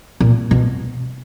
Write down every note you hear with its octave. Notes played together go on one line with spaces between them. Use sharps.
A#2
B2